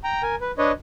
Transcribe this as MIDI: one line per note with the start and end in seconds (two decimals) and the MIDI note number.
0.04 0.22 79
0.04 0.22 82
0.23 0.35 70
0.23 0.35 80
0.41 0.52 71
0.58 0.72 62
0.58 0.72 71
0.58 0.72 73
0.58 0.72 75